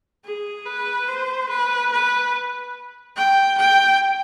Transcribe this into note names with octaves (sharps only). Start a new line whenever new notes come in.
G#4
B4
C5
B4
B4
G5
G5